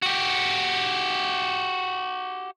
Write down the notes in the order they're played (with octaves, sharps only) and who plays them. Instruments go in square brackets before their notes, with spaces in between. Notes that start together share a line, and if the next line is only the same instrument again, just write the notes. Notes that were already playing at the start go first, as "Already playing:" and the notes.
[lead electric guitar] F#4 G4